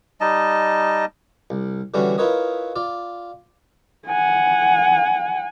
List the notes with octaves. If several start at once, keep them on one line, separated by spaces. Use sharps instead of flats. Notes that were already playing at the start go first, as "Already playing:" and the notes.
G3 D#4 D#5 A5
C2
D3 E3 G3 C#4 E4 F#4
E4 F4 A#4 B4 C#5 D#5
F4 D5
F#5 G#5